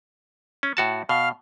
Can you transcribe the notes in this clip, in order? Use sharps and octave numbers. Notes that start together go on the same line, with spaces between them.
C#4
A2 F#4 A5
B2 F5 F6